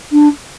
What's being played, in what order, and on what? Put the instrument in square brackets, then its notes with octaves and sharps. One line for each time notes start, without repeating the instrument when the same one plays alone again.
[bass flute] D4